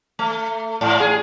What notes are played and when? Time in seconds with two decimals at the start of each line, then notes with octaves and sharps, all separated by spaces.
0.19 A3
0.81 G#2
1.00 G#4